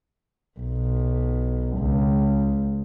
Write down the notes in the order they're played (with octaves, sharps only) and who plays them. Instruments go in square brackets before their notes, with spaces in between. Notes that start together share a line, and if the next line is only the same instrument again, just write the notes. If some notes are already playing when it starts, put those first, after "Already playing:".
[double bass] B1
C#2